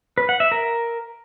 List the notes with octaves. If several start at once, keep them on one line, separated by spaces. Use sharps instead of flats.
B4
F#5
E5
A#4